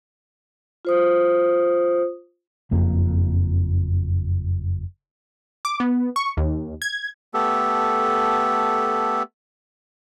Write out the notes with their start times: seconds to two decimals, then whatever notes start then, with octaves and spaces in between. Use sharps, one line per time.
0.85 F4 C5 D#6
2.71 F#1 F2 A#3
5.65 D6
5.80 B3
6.16 C#6
6.37 D#2
6.82 G#6
7.34 A3 B3 G4 A4